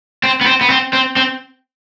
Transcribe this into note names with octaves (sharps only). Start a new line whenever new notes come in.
C4
B3
C4
B3
C4
C4
C4